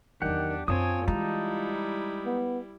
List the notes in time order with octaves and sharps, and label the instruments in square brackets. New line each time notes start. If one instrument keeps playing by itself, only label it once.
[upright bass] E2 F#3 [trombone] D#3 [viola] D4 [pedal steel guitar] G4 F#5
[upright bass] F#2 [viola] C4 C#5 [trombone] F4 [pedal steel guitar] G#5 A5 D#6
[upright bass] E3 G#3 [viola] G3 E4 [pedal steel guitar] D#4 A5 A#5
[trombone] B3